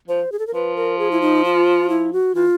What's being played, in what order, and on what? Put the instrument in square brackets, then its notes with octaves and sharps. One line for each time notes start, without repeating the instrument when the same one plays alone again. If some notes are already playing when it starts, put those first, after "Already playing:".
[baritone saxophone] F3 [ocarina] C5
[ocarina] G#4
A4
A#4
[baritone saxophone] F3 [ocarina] B4
[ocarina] A#4
G#4
E4
D#4
F4
E4
F#4
[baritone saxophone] E3 [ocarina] F4